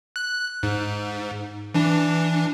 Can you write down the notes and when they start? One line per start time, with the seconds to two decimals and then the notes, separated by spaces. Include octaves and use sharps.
0.16 F#6
0.63 G#2
1.74 E3 D4